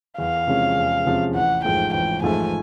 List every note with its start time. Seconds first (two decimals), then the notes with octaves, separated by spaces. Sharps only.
0.18 E2 F5
0.47 C3 F3 G#3 C#4
0.77 E2
1.06 C3 F3 G#3 C#4
1.35 A1 F#5
1.64 G#2 F3 A3 G5
1.94 A1 G5
2.22 G#2 F3 A3 G#5